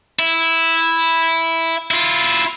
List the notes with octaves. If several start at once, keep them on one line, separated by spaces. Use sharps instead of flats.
E4
E4 F4